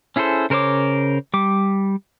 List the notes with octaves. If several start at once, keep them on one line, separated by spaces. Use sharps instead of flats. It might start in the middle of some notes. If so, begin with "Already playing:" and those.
C#4 E4 G#4 A4 C5
C#3 A#4 C5 C#5 D6
G3 D6